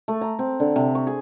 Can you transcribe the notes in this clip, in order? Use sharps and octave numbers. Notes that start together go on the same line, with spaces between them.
A3
A#5
C4
D3
C3
C#6
G#4